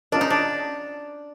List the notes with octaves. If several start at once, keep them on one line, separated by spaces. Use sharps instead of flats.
C#4 D4 F4 A#4 D#5
D#4
D4